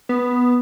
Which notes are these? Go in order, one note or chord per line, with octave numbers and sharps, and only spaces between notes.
B3